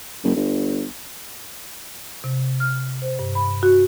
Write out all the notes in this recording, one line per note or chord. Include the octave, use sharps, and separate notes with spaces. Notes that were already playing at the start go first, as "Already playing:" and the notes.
F#1
G1
C3
F6
C5
G2
B5
F#4